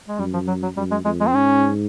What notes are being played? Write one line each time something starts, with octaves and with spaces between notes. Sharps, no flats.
G#3
F#2 G3
F3
F#3
F#3
F#2 G3
G#3
F2 G#3
G#3
C4
G#2 C#4